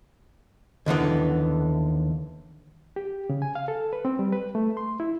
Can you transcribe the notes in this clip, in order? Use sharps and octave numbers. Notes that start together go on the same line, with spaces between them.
D#2 D3 E3 B3
G4
C#3
G#5
F5
A4
B4
C4
G3
B4
A3
C6
E4